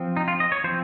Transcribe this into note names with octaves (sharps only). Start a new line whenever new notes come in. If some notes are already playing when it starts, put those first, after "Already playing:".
Already playing: F3 C4
D#4
F4
D#5
C#5
F3 C4 C5